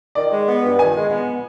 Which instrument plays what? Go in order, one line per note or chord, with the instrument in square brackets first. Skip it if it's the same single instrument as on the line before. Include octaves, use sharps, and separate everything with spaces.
[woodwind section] D#3 [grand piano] D5
[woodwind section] G#3
B3
G2
[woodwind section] D#3 [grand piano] G#5
[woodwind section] G#3
B3